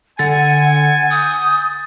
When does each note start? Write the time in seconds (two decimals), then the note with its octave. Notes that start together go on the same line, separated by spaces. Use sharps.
0.19 D3 F#5 G#5 A6
1.10 D#6 G6